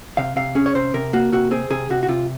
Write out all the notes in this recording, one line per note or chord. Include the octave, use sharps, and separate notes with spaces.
C3 F5
C3 F5
C#4 G#4
C#5
C3 C5
C3 A#4
A#3 F#4
C3 F#4
C4 G#4
C3 G#4
C3 F#4
F#4
C3 F4